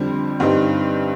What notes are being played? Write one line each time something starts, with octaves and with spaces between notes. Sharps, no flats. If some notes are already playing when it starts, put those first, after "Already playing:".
Already playing: F2 D3 G3 C4
G2 D3 G3 C4 D#4